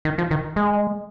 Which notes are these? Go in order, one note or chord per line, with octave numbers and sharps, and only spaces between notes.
D#3
F3
D#3
G#3